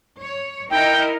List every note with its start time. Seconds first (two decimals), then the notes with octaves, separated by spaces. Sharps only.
0.21 C#5
0.70 D#4 E4 A#4 G5